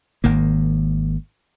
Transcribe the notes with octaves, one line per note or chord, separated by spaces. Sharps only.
G#1 D#3 A#3